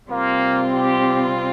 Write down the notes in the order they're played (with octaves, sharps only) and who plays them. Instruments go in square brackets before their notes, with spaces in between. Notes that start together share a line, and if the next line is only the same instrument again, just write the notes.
[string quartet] C3 G3 C4 F4 [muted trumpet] A#3
[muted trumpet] G4